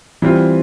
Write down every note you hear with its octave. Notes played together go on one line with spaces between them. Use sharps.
E3 G3 C4 F4